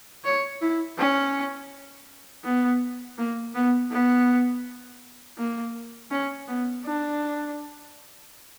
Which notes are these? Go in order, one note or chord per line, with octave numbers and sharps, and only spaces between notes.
C#5
E4
C#4
B3
A#3
B3
B3
A#3
C#4
B3
D4